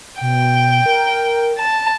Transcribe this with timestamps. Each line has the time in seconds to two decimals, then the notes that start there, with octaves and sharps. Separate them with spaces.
0.21 B2 G5
0.86 A#4
1.59 A5